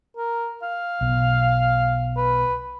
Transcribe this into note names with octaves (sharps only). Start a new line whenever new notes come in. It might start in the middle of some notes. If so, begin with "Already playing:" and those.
A#4
F5
B1 B2
B4